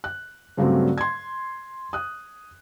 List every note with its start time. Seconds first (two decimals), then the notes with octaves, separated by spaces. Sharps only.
0.04 F#6
0.57 G2 C#3 F#3 G3 A3 C4
0.98 C6 G#6
1.93 D#6 F#6